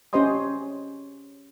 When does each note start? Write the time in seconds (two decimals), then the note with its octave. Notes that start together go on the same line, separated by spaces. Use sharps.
0.13 C#4 G4 C5 D#5 C6 D#6